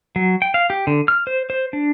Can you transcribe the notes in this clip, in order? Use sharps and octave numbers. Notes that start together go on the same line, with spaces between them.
F#3
G5
F5
G4
D3
F6
C5
C5
D4